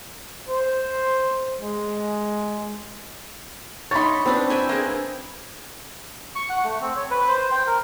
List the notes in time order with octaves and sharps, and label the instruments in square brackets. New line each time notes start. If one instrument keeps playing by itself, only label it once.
[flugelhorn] C5
G#3
[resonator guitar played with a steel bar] D#4 C#5 [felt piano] B5 C6 A6
[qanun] C4 D4 B4
E5 G5 G#5
[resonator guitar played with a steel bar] A#3 D4 G#4
[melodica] C#6
F#5
A3
C4
C#5
B4
C5
G5
A#4